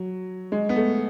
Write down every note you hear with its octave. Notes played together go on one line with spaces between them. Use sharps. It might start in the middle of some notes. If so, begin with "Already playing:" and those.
Already playing: F#3
G#3
B3
A3